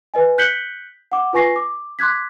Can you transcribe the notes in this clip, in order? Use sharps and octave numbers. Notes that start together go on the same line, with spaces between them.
B4 D#5 G#5
F#6 G6 B6 C#7 F#7 G7
F#5 D6
F4 B4 G#5 C#6 A#6 C7
D6
C6 D6 F#6 G#6 B6